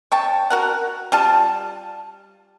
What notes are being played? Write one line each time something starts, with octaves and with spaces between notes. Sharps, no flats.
C#5 G5 A5
F#4 A#4 F#5
G3 F4 A5